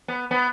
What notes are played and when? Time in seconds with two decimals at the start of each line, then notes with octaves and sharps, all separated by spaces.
0.08 B3
0.31 B3